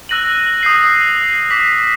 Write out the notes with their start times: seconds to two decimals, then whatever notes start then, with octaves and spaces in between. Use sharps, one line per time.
0.09 E6 F#6 A#6 D#7 F#7
0.63 D#6 G6 C7
1.50 D6 B6 F#7